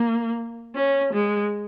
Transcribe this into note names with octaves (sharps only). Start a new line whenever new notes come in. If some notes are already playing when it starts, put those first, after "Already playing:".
Already playing: A#3
C#4
G#3